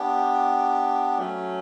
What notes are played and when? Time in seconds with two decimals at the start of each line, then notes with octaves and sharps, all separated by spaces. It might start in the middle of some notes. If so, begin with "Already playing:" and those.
Already playing: B3 D4 G4
1.17 F#3 A3 C#4